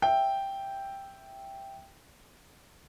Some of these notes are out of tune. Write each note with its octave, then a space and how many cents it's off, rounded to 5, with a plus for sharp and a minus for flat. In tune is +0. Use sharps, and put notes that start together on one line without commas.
E5 +0 G5 +0